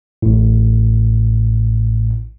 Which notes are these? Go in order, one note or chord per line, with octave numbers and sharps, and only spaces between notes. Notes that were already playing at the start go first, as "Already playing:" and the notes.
A1 A2